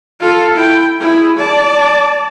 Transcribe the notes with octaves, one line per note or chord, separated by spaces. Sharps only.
F4 A4
E4 G5
E4 G#4
D5 A5